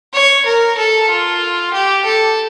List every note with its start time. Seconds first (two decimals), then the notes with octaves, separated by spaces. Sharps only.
0.14 C#5
0.45 A#4
0.77 A4
1.09 F4
1.73 G4
2.05 A4